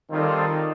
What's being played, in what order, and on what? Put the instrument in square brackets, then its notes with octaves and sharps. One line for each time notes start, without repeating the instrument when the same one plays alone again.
[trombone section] D#3 [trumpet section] G3 C4 F4 A4 D5